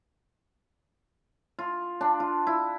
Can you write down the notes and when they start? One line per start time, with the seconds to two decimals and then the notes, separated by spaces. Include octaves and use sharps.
1.59 F4
2.01 D4
2.20 F4
2.47 E4